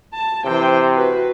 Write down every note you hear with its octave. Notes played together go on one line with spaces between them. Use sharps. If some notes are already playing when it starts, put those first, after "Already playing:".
A5
C3 E3 C5 G5
F#4 B4